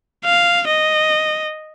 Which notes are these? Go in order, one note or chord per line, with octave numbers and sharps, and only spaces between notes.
F5
D#5